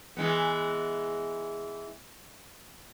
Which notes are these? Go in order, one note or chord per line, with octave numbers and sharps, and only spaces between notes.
E3 G#3 B3